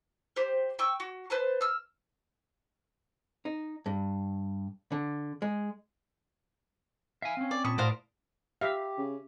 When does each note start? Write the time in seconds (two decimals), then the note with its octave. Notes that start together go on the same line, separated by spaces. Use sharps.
0.36 G4 C5
0.79 G5 C#6 E6
1.00 F#4
1.30 B4 C5 A5
1.61 E6 F6
3.45 D#4
3.86 G2
4.92 D3
5.42 G#3
7.22 E5 F5 G#5
7.37 C4 C#4
7.51 D5
7.65 A#2 A5 B5 C#6 D#6
7.78 A2 F#4 A#4 C5 D5 F5
8.61 G4 E5 F5
8.98 C#3